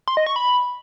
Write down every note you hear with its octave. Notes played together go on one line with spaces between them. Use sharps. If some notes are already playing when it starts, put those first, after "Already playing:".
C6
D#5
C#6
B5